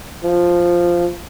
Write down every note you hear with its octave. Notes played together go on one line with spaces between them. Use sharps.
F3